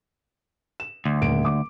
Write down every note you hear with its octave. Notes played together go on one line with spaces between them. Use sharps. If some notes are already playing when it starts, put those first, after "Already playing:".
E7
D2
D#1 D7
D6